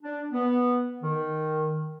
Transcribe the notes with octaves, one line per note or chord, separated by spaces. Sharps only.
D4
B3
D#3